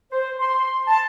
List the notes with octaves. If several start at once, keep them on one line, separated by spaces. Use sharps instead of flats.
C5
C6
A5